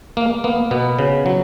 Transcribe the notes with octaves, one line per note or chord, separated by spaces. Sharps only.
A#3
A#3 B3
B2 B3
C#3
F#3